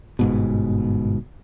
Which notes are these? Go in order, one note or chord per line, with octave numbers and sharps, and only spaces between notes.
G1 G#2 B2